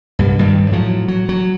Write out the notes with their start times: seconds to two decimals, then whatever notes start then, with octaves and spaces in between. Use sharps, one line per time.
0.19 C2 G2
0.39 G2 D#3 G3
0.71 A2 F3 F#3
1.08 F#3
1.29 F#3